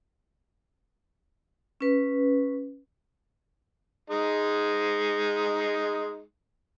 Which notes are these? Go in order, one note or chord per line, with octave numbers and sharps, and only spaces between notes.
C#4 B4
G#3 D#4